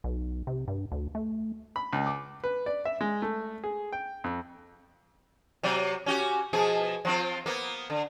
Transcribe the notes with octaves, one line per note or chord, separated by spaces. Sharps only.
B1
C3
G2
D2
A3
B5
C#2
D6
B4
D5
E5
G#3
A3
G#4
G5
F2
C3 F#3
C#4 F#4 G4
B2 F3 G#4
F3 C4 F4
A#3 B3
D3